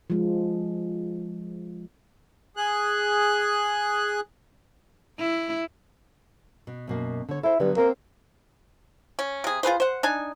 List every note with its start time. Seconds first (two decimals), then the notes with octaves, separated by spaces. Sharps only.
0.10 F3 G#3
2.57 G#4 F#6
5.19 E4
6.67 B2
6.88 F#2 B2 A#3
7.29 D3 C#5
7.43 E4 A4 C5
7.60 G2 D3 F#3 B3
7.77 A#3 C4 A#4 C5
9.19 C#4
9.44 C3 G#4
9.63 F4 G#4 B4 C5
9.80 C5 F#5
10.03 D4 D#4 G#5